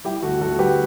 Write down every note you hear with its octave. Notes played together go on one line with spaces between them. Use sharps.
G3 E4 G4
D2 F#4 A4
D2 F#4 A4
G3 G4 B4